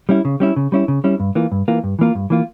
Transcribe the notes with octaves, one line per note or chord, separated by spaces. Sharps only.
G3 C#4 E4
C#3
G3 C#4 E4
C#3
G3 C#4 E4
C#3
G3 C#4 E4
G2
E3 A#3 F4
G2
E3 A#3 F4
G2
E3 A#3 F4
G2
E3 A#3 F4